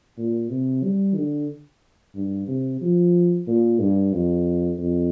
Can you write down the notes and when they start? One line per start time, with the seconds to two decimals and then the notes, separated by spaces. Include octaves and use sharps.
0.18 A#2
0.50 C3
0.83 G3
1.16 D3
2.15 G2
2.48 C3
2.81 F3
3.47 A#2
3.80 G2
4.13 F2
4.79 F2